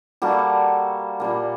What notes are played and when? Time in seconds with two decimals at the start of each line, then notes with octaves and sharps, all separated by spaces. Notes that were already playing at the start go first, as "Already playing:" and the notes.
0.22 G3 A#3 F#4 A4
1.20 A#2 G3 A#3